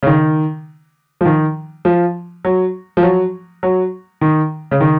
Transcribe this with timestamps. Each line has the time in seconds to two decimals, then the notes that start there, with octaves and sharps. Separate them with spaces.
0.03 C#3
0.07 D#3
1.21 F3
1.25 D#3
1.85 F3
2.45 F#3
2.97 F3
3.03 F#3
3.63 F#3
4.21 D#3
4.71 C#3
4.81 D#3